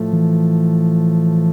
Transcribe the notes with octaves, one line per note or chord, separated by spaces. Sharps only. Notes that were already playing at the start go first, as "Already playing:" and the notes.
Already playing: A2 F3 A3
E3